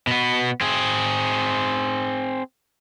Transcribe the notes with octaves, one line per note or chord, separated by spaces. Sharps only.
B2 B3
C4 G#4